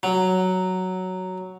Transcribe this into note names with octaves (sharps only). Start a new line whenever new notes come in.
F#3